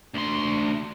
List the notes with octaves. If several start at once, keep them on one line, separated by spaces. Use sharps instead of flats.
D2 C6